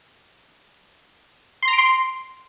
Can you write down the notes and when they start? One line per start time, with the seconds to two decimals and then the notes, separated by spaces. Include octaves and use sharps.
1.62 C6
1.68 A#5
1.73 D7
1.78 C6